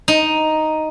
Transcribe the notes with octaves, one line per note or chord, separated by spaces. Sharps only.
D#4